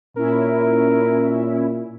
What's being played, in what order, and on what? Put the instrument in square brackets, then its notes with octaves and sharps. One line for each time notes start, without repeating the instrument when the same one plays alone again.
[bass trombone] A#2 [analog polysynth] C#4 E4 [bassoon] A#4